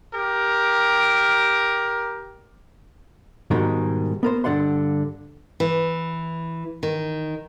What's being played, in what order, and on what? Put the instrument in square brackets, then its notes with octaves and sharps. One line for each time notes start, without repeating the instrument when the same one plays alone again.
[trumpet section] G4 A#4
[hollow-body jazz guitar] G#2 B2 D#3 G3 G#3
B3 A#4 C5
G2 D3 D5 F#5 C6
[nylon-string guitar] E3
D#3